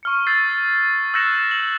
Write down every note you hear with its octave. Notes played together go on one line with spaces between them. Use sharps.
C#6 F6 C#7
E6 F6 G6 A6 C7
E6 F#6 G6 A#6 C#7 E7
F#7